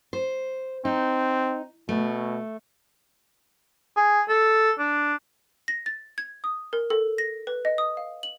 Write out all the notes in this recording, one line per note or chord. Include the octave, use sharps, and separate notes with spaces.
C5
C4 D#4
B2 A3
G#4
A4
D4
A#6
A6
G#6
D#6
A#4
A4
A#6
B4
D#5
D#6
F5
F#7